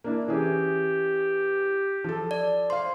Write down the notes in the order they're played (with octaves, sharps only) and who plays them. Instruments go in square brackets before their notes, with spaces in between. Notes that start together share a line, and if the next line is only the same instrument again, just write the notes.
[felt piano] A#3 D4 E4
[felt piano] E3 C#4 G#4 [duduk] G4
[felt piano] F3 A4
[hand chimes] D5
[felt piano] C5 F5 [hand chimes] C6